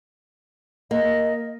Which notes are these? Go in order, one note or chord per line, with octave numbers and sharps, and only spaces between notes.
A#3 D#5